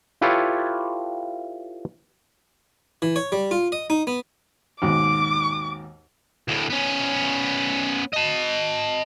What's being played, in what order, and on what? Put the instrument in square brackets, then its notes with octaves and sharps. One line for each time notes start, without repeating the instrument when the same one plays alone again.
[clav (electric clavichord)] E4 F4 G4 A4 B4 C#5
[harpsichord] E3
C#5
G3
F4
D#5
D#4
B3
[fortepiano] D#2 G#2 B2 [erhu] D6
[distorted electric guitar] D2 A2
B3 C#4
D#5 A5